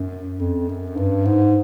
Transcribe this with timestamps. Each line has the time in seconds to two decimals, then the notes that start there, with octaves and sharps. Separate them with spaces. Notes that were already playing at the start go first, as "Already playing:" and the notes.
Already playing: F#2
0.39 F2
0.69 F#2
0.97 G2
1.25 G#2